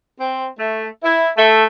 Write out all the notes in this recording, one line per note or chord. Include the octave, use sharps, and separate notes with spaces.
C4
A3
E4
A3